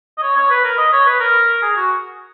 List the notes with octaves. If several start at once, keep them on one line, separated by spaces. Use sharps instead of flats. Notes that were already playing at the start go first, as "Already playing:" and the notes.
D#5
C#5
C#5
B4
A#4
D#5
C#5
B4
A#4
G#4
F#4